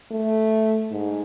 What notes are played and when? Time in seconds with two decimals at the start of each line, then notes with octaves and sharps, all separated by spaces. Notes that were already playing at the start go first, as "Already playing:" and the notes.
0.11 A3
0.91 G#2